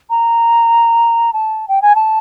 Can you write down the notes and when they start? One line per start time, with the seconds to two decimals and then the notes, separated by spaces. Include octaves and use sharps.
0.10 A#5
1.33 A5
1.68 G5
1.82 G#5
1.95 A5